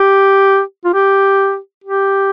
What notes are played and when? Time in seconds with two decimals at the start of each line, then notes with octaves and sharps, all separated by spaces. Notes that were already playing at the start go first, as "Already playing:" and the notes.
Already playing: G4
0.85 F4
0.94 G4
1.84 G4